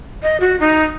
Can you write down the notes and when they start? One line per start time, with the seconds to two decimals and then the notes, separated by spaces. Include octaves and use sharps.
0.23 D#5
0.40 F#4
0.60 D#4